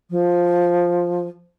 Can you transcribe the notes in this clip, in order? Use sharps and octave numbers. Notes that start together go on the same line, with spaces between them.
F3